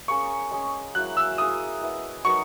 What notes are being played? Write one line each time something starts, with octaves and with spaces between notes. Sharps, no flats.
A#3 C#4 G#4 C#6
G#3 C#4 G#4
F#3 A#3 E4 F#6
E6
A#3 E4 G#4 D#6
G#3 B3 E4
F#3 B3 D#4 A#4 C#6